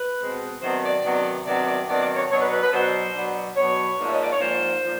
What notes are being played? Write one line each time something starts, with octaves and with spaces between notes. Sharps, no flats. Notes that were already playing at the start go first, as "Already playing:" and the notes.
Already playing: B4
B2 G#3 C4
C3 D#3 F#3 B3 D4 C5
D5
C3 D#3 F#3 B3 D4
C3 D#3 F#3 B3 D4 D5
D5
C3 D#3 F#3 B3 D4 D5
D5
C#5
B2 F#3 B3 D4 C#5
B4
B4
B4
B2 F#3 B3 D4 C5
B2 F#3 B3 D4
B2 F#3 B3 D4 C#5
G#2 F3 A#3 D4
E5
D#5
D5
C#5
G#2 F3 A#3 D4 C5
F3 A#3 D4